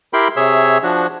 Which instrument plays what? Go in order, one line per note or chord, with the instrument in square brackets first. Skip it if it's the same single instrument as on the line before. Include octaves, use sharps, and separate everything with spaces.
[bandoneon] E4 G4 A#4 G5 B5 C6
C3 G#4 C#5 E5 E6
F3 D4 F#4